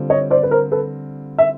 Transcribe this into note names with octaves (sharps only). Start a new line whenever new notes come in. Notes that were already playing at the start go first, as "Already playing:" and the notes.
Already playing: D3 G3 C4 F4
C#5 D#5
C5 D5
B4
A#4 C5
A4 B4
E5